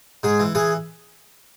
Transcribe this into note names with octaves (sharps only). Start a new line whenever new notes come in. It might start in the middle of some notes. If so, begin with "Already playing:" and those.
G#2 G#4
E3
E3 G#4